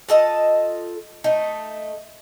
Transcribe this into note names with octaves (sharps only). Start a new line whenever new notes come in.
F4 A4 D#5 A5
A3 D#4